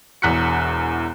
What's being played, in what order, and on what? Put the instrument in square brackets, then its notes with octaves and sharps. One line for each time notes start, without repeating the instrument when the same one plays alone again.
[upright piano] E1 E2 F#6 B6 C#7